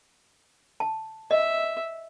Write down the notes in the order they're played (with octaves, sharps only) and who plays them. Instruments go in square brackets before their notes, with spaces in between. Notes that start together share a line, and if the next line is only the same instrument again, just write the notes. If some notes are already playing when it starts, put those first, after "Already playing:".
[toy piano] A5
[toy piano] D#5 [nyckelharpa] E5